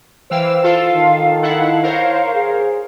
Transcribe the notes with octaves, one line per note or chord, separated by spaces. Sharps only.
E3 C5 F5 G5 E6
F4 A4 F5
D#3
E4 A4 F5 F#5
A#4 C5 C#5
G#4